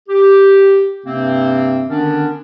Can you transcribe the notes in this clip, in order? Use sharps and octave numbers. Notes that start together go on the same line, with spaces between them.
G4
G2 C3 A#3 C4
D3 D#3 B3 C#4 D4